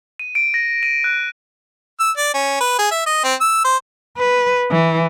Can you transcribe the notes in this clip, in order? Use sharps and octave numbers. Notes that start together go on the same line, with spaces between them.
D#7
D7
A#6
D#7
F#6
E6
D5
C#4
B4
G#4
E5
D#5
C4
E6
C5
B4
E3